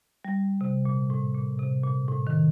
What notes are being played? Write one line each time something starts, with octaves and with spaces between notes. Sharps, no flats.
G3
C3
A#2
A2
A#2
C3
A#2
A2
D#3